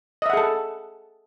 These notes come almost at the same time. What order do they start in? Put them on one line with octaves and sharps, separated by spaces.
D#5 E5 F#5 G#4 A4